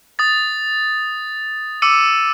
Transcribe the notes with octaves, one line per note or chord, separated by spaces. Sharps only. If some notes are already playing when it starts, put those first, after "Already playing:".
D#6 A6
D6 E6 C#7 D#7